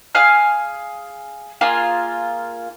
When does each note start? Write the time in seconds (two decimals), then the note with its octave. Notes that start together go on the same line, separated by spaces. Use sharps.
0.15 G#4 F5 G#5 F6
1.61 A#3 F4 G#4